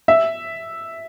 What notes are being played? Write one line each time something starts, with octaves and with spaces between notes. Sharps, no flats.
E5